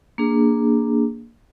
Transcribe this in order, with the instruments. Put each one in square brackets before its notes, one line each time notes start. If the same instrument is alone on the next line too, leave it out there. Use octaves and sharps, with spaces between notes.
[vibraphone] A#3 D4 G#4